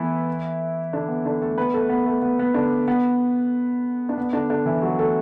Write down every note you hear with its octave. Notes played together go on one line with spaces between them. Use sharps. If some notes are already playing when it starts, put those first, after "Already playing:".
Already playing: E3 A3 B3 E4 A4 B4
D3 D4
B3
D3 D4
A3 A4
B3 B4
A3 A4
B3
A3
B3
B3
D3 D4
B3
D4
B3
D3 D4
D3 D4
E3 E4
F#3 F#4
A3 A4